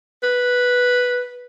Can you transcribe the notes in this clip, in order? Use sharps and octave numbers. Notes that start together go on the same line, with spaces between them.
B4